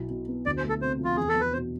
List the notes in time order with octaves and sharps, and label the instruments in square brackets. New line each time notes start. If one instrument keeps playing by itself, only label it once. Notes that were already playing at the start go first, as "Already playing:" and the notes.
Already playing: [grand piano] B1 E4
B2
B3
[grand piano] D2 [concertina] D5
[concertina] C5
[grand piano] A3
[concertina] A4
[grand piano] C3 [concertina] C5
[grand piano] F3 [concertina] F4
[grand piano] E2 [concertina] G#4
[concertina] A4
[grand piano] E2
[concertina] B4
[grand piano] B2 [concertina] C5